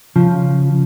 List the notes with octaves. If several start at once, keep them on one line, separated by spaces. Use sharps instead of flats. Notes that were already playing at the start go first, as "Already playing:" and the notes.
C#3 F3